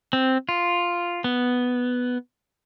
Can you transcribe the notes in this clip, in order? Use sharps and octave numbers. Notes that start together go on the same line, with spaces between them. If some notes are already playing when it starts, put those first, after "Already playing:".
C4
F4
B3